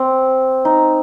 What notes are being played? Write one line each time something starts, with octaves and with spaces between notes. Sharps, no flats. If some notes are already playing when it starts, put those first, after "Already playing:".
Already playing: C4
D#4